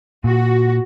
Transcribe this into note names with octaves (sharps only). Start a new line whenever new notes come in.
A#2 F#4